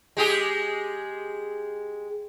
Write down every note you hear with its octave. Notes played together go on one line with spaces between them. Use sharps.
G#3 G4 G#4